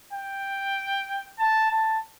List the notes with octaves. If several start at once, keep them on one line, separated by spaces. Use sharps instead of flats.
G5
A5
A5